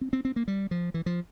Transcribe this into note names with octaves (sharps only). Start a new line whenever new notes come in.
C4
C4
C4
A#3
G3
F3
E3
F3